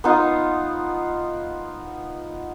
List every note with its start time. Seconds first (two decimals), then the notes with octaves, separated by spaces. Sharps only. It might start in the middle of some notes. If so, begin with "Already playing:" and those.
0.04 B3 D#4 F4